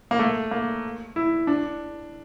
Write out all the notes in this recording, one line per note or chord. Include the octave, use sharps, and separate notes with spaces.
A#3
A3
A#3
E4
D4